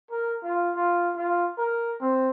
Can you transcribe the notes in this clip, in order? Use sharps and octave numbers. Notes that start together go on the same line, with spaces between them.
A#4
F4
F4
F4
A#4
C4